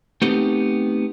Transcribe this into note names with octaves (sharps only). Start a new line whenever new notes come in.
A3 B3 C4 D#4 G4